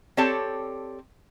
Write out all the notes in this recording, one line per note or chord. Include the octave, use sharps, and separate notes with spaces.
C4 G4 A4 C#5 D5 A5